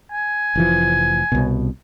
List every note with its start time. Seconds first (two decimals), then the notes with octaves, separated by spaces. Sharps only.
0.12 G#5
0.55 F1 E3 F3
1.32 C2 B2